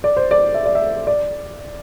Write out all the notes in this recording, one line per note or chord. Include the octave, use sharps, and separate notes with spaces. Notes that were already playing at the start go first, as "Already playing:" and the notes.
D5
C5
D5
E5
D5
E5
D5